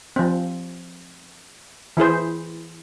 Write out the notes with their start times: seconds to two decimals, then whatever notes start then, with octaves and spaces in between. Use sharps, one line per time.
0.16 F3 C4
1.97 E3 E4 G#4 C5